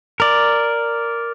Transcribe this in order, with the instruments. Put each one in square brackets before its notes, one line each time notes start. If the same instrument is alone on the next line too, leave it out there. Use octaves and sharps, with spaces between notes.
[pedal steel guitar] A#4 D5